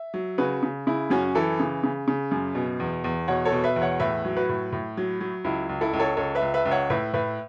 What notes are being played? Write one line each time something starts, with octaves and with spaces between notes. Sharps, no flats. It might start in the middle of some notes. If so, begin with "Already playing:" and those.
Already playing: E5
F#3
C#3 F#4 B4
C#3
C#3 E4
F#2 C#4 F#4
E3 E4 A4
C#3
C#3
C#3
F#2
B2
E2
E2
B2 C#5 F#5
A4 C#5
B2
B4 E5
E2
C#5 F#5
A2 B4 E5
F#3
F#4 B4
A2
A2
F#3
F#3
C#2 E4
C#2
E4 A4
C#2
A4 C#5
C#2 A4 C#5
B4 E5
C#2
B4 E5
C#2
C#5 F#5
A2 B4 E5
A2 B4 E5